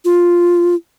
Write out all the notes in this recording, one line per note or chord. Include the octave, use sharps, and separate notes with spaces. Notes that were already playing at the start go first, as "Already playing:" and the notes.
F4